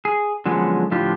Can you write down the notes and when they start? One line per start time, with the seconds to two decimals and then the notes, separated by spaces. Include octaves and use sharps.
0.05 G#4
0.46 D3 F3 F#3 G#3 B3 C#4
0.91 A2 D3 F3 D4 F4 G4